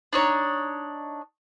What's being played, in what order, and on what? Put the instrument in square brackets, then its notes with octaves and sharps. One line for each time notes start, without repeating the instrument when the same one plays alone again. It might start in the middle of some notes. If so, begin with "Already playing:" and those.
[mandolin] D4 D#4 C#5